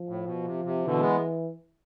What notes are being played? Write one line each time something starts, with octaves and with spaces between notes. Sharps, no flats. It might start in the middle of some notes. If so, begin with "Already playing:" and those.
Already playing: F3
A2
B2
C3
C3
B2 D3 E3
G#3 B3